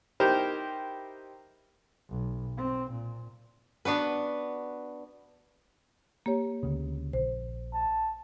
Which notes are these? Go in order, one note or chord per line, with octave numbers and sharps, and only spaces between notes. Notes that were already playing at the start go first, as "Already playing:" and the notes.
D#4 E4 G4 A#4 C5
B1
C4
A#2
B3 D4 F#4 B4
A#3 G4 C#5
D2 C#3
A#1 C5
A5